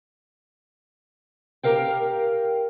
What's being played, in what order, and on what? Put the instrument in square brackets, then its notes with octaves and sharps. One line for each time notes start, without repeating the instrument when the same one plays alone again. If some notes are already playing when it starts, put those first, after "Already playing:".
[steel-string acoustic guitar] G4 G#4 A#4 F5 G5